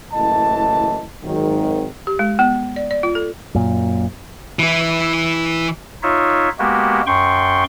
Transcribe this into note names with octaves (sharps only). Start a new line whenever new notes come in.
F#1 A2 E3 D#5 A5
G#1 G#2 D#3 F#3
G4
G#3
B3
D5
D5
F4
A4
F#2 A#2
E3 E4
D#4 F4 C#5 E5
G#3 A#3 B3 F#4 G4
F#2 G5 C6 C#6